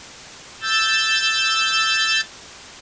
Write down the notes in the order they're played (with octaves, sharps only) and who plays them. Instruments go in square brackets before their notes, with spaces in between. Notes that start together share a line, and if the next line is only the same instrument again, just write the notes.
[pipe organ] E6 G6 A6